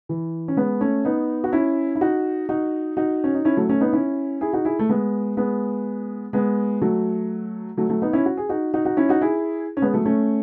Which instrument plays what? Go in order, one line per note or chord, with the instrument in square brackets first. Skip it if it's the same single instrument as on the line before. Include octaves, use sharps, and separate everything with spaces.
[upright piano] E3
C#4
G#3 B3
A3 C#4
B3 D#4
F#4
C#4 E4
E4
D#4 F#4
D#4 F#4
D#4 F#4
C#4
D#4
C#4 E4
F#3 A3
A3 C#4
B3 D#4
C#4 E4
E4 G#4
D#4 F#4
E4 G#4
A3
G#3 B3
G#3 B3
G#3 B3
F#3 A3
F#3 A3
F#3 A3
B3 D#4
C#4 E4
F#4
G#4
D#4 F#4
D#4 F#4
D#4 F#4
C#4 E4
D#4 F#4
E4 G#4
C#4
G#3 B3
F#3 A3
A3 C#4